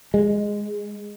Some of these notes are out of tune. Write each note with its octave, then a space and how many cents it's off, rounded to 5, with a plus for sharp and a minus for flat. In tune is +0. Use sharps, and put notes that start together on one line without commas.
G#3 -5